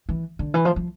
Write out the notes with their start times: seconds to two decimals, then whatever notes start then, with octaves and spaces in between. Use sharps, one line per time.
0.09 E3
0.39 D3
0.54 E3
0.65 F3
0.76 F3